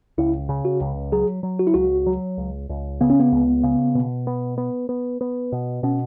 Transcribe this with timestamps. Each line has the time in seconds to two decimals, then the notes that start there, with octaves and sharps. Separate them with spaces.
0.18 C#2 E4
0.49 C#3
0.65 F#4
0.81 C#2
1.12 F#3 G#4
1.43 F#3
1.59 F#4
1.67 E4
1.74 C#2 F#4
2.06 F#3
2.38 C#2
2.69 C#2
3.01 C#3 B3
3.10 C#4
3.20 B3
3.32 C#2
3.63 C#3
3.95 B2
4.27 B3
4.58 B3
4.89 B3
5.21 B3
5.52 B2
5.83 B2 C#4